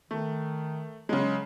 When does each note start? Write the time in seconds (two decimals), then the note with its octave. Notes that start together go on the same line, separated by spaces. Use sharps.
0.11 D#3 A3
1.09 C#3 F#3 G#3